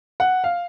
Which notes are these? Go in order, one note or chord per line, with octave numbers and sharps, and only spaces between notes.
F#5
F5